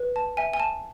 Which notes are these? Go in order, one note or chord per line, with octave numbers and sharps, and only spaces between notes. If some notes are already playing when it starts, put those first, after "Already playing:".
Already playing: B4
A5
E5 G#5
G#5
A5